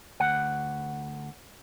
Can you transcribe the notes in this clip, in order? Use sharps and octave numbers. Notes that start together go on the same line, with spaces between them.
D2 F#5